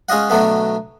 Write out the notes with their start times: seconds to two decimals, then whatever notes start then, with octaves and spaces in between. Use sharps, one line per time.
0.09 G#3 C#4 F4 D#5 F#5
0.30 B2 D3 F#3 A3 B3